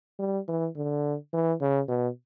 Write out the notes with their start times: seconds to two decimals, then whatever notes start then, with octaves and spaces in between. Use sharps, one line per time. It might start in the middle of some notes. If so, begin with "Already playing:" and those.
0.19 G3
0.48 E3
0.76 D3
1.33 E3
1.61 C#3
1.88 B2